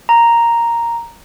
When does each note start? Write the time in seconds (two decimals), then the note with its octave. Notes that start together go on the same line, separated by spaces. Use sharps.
0.09 A#5